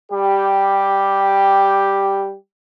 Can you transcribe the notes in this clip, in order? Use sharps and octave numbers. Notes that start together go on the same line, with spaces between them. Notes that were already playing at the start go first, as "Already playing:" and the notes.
G3 G4